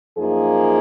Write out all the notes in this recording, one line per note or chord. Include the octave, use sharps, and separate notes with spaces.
F#2 F3 A#3 D#4 G#4